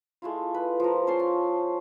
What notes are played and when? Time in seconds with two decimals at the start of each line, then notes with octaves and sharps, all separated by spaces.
0.22 G#3 A3 E4 F4
0.54 B4
0.80 F3 A#4
1.07 C#4 C5 A5 C6
1.20 A5